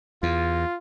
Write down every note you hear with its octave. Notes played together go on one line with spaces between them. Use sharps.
E2 F4